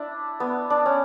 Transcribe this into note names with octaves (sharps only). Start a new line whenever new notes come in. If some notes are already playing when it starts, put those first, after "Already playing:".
Already playing: D4 E4
B3
D4
C#4